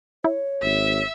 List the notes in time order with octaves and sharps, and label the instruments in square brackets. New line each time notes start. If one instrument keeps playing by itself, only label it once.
[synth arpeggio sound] E4 [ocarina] C#5
[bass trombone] G#1 [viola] E5